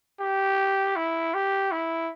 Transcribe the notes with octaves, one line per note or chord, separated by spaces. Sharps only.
G4
E4
G4
E4